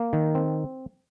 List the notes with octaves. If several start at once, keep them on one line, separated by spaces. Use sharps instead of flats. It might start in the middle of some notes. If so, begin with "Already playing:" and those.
Already playing: A#3
D#3
C4